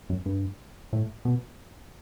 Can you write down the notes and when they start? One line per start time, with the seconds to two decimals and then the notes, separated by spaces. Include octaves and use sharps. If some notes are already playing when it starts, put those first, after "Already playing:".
0.09 F#2
0.26 G2
0.93 A2
1.25 B2